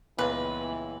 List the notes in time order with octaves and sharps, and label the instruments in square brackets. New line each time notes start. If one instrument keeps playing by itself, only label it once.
[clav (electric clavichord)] C#2 A#2 [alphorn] E3 [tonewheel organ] B3 [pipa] B4